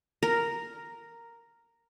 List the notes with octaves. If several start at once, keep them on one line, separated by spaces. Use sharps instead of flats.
A#4 A#5